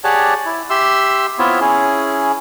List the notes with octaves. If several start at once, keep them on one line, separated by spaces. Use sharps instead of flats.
G4 G#4 C#5 D5 F#5 A5
E4
G4 E5 C6 E6
B3 C4 E4 F4 C#5 E5
C#4 E4 G#4